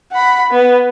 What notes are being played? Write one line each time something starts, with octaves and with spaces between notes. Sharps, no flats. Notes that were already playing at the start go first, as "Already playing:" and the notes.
F#5 B5
B3